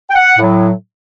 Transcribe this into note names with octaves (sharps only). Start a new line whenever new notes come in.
G5
F#5
A2 F#3